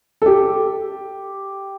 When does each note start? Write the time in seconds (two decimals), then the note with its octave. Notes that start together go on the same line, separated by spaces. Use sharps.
0.22 A4
0.26 G4